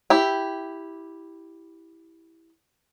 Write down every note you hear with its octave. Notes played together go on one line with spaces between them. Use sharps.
E4 G4